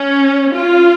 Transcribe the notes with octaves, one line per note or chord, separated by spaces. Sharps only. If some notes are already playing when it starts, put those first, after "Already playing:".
Already playing: C#4
F4